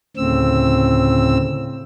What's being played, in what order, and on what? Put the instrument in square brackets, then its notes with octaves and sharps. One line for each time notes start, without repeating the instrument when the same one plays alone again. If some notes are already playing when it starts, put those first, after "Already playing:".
[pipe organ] D2 A2 C#3 C4 E6